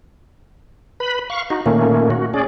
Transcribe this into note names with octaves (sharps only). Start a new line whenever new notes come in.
B4 B5
F5 C#6
D#4 F#4
A#2 D#3 A3 A#3 C#4
F#4
C#4 G#4 D5